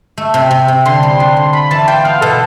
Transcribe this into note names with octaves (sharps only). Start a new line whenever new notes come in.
A3
C3
C3
C3
D3 C6
G3
D4
D3
F4 B5
E3 A5
F4 G5
B3 F5
B2 A4